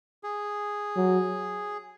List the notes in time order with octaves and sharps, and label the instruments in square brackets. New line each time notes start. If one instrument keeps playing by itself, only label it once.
[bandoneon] G#4
[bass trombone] F#3